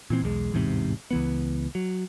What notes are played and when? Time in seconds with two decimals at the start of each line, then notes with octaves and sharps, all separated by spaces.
0.10 A#2 E3 C4
0.22 B1 E2 G3 G#3
0.52 A1 E2 G#2 C3
1.11 C#2 E3 B3
1.75 F#3